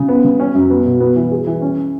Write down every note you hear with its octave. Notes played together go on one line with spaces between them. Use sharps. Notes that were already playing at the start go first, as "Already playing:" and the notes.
Already playing: C#3
B3
C#3
C#4
F#2
B3
B2
B3
E3
G#4
E3
C#4